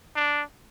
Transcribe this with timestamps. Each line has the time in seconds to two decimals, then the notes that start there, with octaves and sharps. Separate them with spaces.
0.16 D4